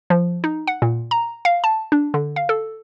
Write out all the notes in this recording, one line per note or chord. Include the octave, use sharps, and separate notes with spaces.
F3
D#4
F#5
A#2
A#5
F5
A5
D4
D3
F5
A4